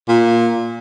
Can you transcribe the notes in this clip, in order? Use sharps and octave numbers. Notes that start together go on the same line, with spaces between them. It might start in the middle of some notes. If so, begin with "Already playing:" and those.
A#2